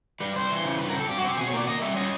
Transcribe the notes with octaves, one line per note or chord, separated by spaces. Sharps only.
G3 B4
G3 C5
E3
C#3
G2 B4
A#4
C4 A4
G2 G4
F#4
C4 G4
B2 G#4
C#5
A#3 D5
A#3 D#5
G3 E5
C#4 D#5